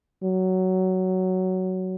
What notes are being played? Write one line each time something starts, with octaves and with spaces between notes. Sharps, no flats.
F#3